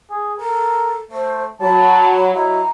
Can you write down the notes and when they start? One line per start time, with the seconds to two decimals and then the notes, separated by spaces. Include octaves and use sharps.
0.10 G#4
0.40 A4 A#4
1.11 A3 C5
1.61 F#3 A5 B5
2.35 F#3 E4 F#4 D#5 A#5